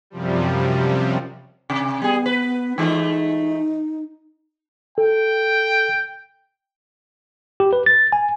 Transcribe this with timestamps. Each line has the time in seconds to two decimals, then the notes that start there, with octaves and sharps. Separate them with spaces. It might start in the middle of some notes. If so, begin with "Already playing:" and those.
0.10 F#2 C3 F3 G3
1.70 C3
2.02 G3 B3 G#4
2.26 B4
2.78 E3 G#3 A3 D#4
4.98 A4 G5
7.60 G4
7.73 B4
7.86 A6
8.12 G#5